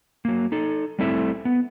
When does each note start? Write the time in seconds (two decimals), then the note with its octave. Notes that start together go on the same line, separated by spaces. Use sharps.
0.25 F#3 A#3
0.52 D#4 A4
0.99 G3 A3 C4 E4 A4 E5
1.45 B3